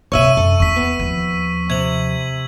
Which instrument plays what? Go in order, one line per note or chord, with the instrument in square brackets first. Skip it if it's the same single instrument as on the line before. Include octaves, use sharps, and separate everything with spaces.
[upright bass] G2 C3 [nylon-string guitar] C#5 D#5 E5 [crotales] C#6 E6 D#7
[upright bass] F#2 [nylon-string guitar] A4
[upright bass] E2 E4 [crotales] C#6 B6
[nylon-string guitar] B3
[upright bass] D#2 F3
[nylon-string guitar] C3 [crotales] G#6 F#7